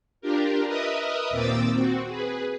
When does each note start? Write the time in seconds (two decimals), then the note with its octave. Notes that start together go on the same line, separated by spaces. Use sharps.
0.21 D4 F4 G4 A#4
0.66 A#4 B4 D#5 E5 D#6
1.30 D#2 A#2 C4 D6 E6 A6
1.73 C4 F#4
2.08 G#4 B4